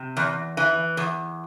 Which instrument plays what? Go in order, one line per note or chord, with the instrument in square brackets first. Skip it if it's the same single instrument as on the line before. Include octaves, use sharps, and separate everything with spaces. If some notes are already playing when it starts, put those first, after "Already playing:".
Already playing: [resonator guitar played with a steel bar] C3
E2
E3
E2